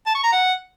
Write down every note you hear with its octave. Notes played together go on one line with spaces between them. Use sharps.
A5
C#6
A#5
F#5